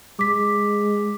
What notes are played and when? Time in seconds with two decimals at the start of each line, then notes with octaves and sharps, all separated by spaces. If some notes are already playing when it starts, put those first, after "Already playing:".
0.19 G#3 D6 B6